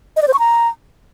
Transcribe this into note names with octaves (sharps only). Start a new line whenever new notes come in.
D#5
D5
C5
C#6
A#5